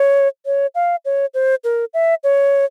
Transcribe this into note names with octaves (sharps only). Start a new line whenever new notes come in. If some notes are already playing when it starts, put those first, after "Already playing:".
Already playing: C#5
C#5
F5
C#5
C5
A#4
E5
C#5